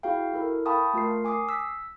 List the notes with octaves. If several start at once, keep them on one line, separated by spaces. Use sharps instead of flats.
E4 F#4 G#4 F5 G5
E4 A4 A#4
F5 G5 A5 B5 C#6 D#6
A3 F4 A#4 C7
G#5 D6 D#6 C7
E6 B6